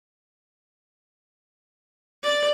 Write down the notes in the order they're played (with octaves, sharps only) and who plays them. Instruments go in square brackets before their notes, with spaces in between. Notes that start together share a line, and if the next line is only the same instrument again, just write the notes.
[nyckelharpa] D5